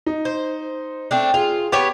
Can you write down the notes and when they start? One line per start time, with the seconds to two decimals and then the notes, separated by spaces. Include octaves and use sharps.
0.06 D#4
0.25 C5
1.11 A3 C4 D4
1.34 F4 G#4
1.72 B3 G4 C#5 D6